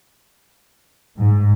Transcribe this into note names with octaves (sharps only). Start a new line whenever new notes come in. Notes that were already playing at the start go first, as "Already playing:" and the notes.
G#2